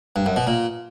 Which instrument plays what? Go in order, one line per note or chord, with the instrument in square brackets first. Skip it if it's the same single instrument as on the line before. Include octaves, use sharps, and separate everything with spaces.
[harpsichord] G2
F#2
B2
A#2